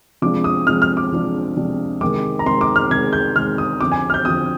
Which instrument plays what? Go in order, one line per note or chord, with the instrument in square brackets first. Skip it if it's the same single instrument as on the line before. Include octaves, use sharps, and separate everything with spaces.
[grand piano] C3 F3 G#3 D4 D6
D#6
C3 F3 G#3 D4 F6
F6
D6
C3 F3 G#3 D4
C3 F3 G#3 D4
C3 D#3 G#3 D6
A#5
C3 D#3 G#3 C6
D6
F6
C3 D#3 G#3 G#6
G6
C3 D#3 G#3 F6
D#6
D3 F3 C4 D6
G#5
F6
G6
D3 F3 C4 D#6